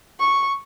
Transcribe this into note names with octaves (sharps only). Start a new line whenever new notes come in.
C#6